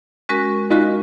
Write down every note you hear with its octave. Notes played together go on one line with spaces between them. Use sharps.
G#3 C#4 F#4 A#4
G#3 C#4 D#4 F4 F#4 A#4